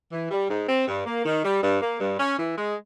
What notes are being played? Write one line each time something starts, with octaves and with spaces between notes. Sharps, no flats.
E3
G3
G#2
C4
G2
A#3
D#3
G3
G2
A#3
G2
C#4
E3
G#3